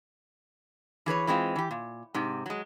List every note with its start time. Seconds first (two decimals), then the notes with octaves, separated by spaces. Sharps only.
1.06 E3 G#4 B4 C#5
1.27 E3 G#3 C4 D#4 F4
1.56 E3 G4
1.71 A#2
2.14 G#2 C3
2.46 F#3 G#3